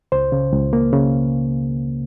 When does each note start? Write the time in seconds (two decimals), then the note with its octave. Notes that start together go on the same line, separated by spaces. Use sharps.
0.12 C#2 C5
0.32 C#3
0.53 C#2
0.73 A#3
0.93 C#3